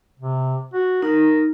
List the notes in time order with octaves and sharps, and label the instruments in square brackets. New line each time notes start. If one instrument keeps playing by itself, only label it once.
[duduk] C3
F#4
[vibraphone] D#4 [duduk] A#4